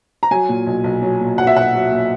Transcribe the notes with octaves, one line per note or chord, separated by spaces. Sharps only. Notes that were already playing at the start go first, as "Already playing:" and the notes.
A#5
F#3 G#5
A#2
B1
B1
F#3
A#2
B1 F#5
E5
B1 F#5
F#3
A#2